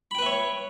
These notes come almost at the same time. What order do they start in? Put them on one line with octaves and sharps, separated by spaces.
B5 G5 B4 E5 C#5